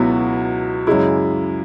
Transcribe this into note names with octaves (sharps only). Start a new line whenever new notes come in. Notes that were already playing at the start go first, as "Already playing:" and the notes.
Already playing: C#2 B2 F#3 B3 E4
F#2 C#3 G#3 E4